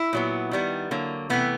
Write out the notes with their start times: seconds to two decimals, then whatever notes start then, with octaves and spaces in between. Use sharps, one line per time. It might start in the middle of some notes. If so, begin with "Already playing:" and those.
Already playing: E4
0.13 A#2 F#3 B3
0.51 D#3 G3 B3
0.91 D3 F#3 A#3
1.30 C3 E3 A3 B3